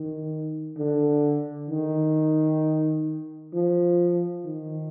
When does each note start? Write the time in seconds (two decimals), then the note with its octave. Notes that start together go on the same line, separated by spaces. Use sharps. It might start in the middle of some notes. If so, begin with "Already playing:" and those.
Already playing: D#3
0.78 D3
1.70 D#3
3.53 F3
4.45 D#3